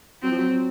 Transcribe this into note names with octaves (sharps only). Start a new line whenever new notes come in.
F#3 C4
F3
F#3